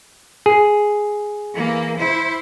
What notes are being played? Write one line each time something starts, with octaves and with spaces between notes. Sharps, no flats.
G#4
E3 A#3
E4 C5